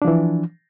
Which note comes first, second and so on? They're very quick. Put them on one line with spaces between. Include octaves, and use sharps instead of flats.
D4 F3 E3